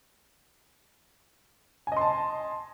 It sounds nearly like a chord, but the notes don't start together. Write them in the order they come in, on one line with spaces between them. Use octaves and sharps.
G#5 D#5 C6 A5